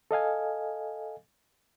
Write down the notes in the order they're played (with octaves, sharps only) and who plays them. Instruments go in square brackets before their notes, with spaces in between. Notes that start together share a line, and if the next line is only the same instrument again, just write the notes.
[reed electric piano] A4 D#5 F5 G#5